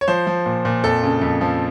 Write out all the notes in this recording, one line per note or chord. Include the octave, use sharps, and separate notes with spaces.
C#5
F3 C5
F3
A#2
A#2
F2 A4
C#3
F2
F3